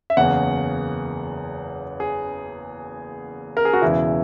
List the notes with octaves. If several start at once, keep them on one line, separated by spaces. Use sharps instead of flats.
E5
F#1 E2 C#3 F#5
G#4
A#4
G#4
F#4
E1 E2 C#3 E4